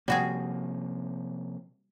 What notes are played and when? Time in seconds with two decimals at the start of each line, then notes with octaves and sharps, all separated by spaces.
0.08 C3 F3 G3 A#3 F#4 G#4